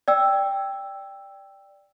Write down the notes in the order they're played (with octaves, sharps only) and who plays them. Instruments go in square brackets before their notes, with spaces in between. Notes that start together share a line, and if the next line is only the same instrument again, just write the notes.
[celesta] D5 G5 E6